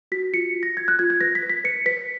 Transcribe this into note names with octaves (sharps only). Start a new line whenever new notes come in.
F#4 B6
F4 C#7
F4
A#6
F4 G#6
F#6
F4 G#6
G#6
B4 A#6
B6
B4
B6
B4 C#7
B4 B6